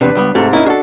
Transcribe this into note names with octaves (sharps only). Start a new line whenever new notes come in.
E2 C3 D4 B4
C#2 G3 B3
G#2 C3 A3
A#3 C#4 D#4 E4 D#5
D4 F#4 G#4 A4